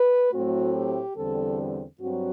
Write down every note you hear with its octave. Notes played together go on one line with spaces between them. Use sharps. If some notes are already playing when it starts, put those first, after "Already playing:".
Already playing: B4
A2 F#3 A3 C4 F#4
G4
E2 D3 G3 C4 A4
G2 F#3 C4 F#4